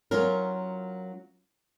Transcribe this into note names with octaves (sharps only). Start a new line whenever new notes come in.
F#3 C#4 F4 A#4